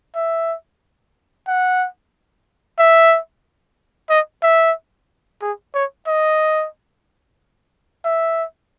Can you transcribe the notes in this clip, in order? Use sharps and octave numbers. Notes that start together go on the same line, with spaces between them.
E5
F#5
E5
D#5
E5
G#4
C#5
D#5
E5